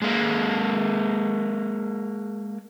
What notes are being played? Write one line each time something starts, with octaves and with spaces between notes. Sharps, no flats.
G#3 A#3